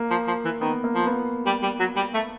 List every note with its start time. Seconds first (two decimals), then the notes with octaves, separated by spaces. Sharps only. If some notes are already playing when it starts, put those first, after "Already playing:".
Already playing: A#3
0.11 F3
0.27 F3
0.45 E3
0.61 D#3 B3
0.84 A#3
0.95 F3
1.07 B3
1.46 G3
1.63 G3
1.79 F#3
1.96 G3
2.14 A3